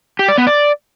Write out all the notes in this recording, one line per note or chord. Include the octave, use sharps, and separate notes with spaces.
G4
D5
B3
D5